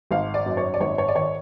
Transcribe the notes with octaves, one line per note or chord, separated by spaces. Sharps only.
G#1 F5
D5
F#2
C#5
D5
G#1 C#5
C#5
D5
D#3 C#5